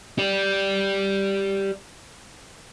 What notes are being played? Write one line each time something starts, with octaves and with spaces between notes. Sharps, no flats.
G4 D5